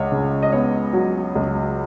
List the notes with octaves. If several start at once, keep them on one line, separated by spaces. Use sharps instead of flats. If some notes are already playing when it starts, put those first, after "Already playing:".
Already playing: C#2 C#5 F#5
C#3
D#5
B3 C#5
F#3
C#2